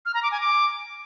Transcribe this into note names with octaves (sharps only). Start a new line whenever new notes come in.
F6
A#5
D6
G#5
D6